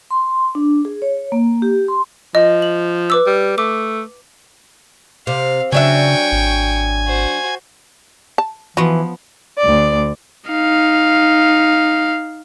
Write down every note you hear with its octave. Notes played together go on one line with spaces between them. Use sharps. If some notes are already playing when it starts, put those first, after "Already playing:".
C6
D4
G#4
C#5
A#3
G4
C6
F3 D#5
F#7
B4 D6 E6
G3
A3 D6
C3 F5
C#3 F#3 D4 E5 G5 G#5 C#6
G#1
F#4 C5
A5
E3 F3 B3 F#4
D2 D5
D#4 F5